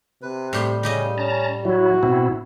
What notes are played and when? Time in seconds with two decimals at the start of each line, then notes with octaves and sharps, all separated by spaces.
0.22 C3 B4
0.53 A2 G3 G4 C6
0.83 C#3 D#4 G4 D#5
1.18 C#4 A5 A#5
1.65 F#3 E4 F#4
2.03 B2 C4 E4